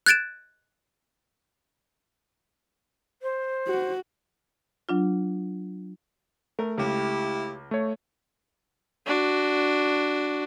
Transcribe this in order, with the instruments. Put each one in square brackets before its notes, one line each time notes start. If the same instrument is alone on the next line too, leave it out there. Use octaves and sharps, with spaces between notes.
[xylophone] F#6 G#6 A6 D7 E7
[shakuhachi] C5
[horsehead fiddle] F#4
[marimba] F#3 D4 F4
[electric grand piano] A3 [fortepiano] A#4
[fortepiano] C#2 [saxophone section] E4 G4
[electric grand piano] A3 C#5
[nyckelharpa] D4 F#4